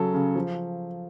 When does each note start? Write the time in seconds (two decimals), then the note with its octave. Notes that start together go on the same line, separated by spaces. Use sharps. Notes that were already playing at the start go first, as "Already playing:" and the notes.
Already playing: C#3 F#3 A4
0.14 C#3
0.35 F3